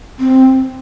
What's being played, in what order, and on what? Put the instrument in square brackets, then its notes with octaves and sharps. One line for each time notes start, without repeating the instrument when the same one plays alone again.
[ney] C4